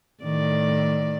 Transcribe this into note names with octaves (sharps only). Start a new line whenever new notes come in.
A2 D#3 D5